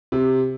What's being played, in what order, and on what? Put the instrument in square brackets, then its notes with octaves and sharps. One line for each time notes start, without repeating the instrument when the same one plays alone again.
[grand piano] C3